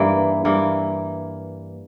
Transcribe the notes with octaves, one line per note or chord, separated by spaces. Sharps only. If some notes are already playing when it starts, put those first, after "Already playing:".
Already playing: G2 E3 A#3
G2 E3 A#3